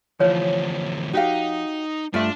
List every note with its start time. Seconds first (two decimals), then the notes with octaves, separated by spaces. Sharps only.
0.20 D2 E3 F3 C#5
1.13 D#4 F#4 G4 F5
2.14 G2 A3 D4 F4 E5